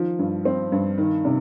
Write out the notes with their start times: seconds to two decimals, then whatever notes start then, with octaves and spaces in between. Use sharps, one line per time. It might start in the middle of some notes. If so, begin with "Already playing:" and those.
Already playing: D#3 F3
0.19 G2
0.45 C4
0.72 G2
0.98 D#3
1.25 C3